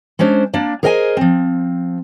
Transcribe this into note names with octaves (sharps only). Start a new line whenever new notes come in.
G#3 C#4 D4 C5
A#3 D4 D5
G#4 A#4 C5 D#5 F#5 G#5
F3 C4